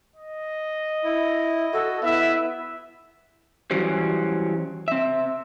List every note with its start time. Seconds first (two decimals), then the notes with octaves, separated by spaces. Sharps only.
0.16 D#5
1.04 E4
1.73 F#4 A4
2.03 B3 E4 B4 E5
3.71 E3 F#3 G3 C#4 F#4 C5
4.88 C4 E5